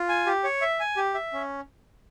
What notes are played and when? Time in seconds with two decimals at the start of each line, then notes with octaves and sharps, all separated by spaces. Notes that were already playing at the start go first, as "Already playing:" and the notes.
Already playing: F4
0.09 G#5
0.26 G4
0.44 C#5
0.61 E5
0.80 G#5
0.97 G4
1.14 E5
1.33 C#4